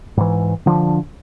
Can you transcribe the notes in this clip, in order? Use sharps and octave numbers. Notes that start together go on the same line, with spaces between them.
G#2 E3
D3 F3 D4